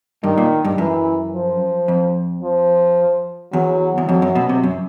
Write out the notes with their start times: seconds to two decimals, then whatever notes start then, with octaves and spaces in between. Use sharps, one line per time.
0.24 G2 D#3
0.38 A#2
0.65 G2
0.78 F#2 E3
1.33 F3
1.88 F2
2.43 F3
3.53 E2 F#3
3.98 E2
4.08 F2 F#3
4.22 F#2
4.35 B2
4.49 C3
4.63 F#2